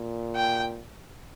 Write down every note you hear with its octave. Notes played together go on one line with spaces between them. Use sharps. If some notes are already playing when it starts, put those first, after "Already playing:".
Already playing: A#2
G5